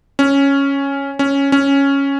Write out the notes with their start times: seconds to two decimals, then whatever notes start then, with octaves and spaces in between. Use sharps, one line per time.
0.19 C#4
1.19 C#4
1.52 C#4